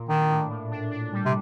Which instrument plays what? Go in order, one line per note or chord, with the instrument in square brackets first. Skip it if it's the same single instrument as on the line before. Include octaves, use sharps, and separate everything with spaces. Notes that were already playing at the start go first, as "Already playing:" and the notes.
Already playing: [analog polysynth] A#2
[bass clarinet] D#3 [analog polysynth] D4
[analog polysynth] A2
A2
D4
D4
G3
[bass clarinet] C3